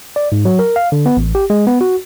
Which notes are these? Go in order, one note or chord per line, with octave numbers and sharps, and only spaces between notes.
D5
G#2
F#3
A#4
F5
D3
B3
A1
G4
G#3
B3
F#4